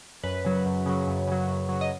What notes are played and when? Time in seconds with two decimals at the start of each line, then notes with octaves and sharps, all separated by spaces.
0.24 F#2 B4
0.45 C#3 F#3
0.66 F#2
0.86 C#3 F#3
1.07 F#2
1.28 C#3 F#3
1.48 F#2
1.69 C#3 F#3
1.81 D#5